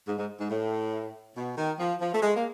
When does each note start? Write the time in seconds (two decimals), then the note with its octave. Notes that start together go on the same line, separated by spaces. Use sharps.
0.08 G#2
0.18 G#2
0.39 G#2
0.50 A2
1.37 B2
1.58 D#3
1.79 F3
2.01 F3
2.14 A3
2.22 G#3
2.36 A#3